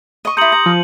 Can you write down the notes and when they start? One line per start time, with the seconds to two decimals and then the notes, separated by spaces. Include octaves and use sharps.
0.25 D#5 C#6 D#7
0.37 E4 G4 A#5 C6 D#6 G6 C#7 F#7
0.52 A#5
0.66 F3